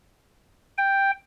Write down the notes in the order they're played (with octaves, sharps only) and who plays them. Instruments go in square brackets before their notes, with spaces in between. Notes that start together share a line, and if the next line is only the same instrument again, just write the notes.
[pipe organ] G5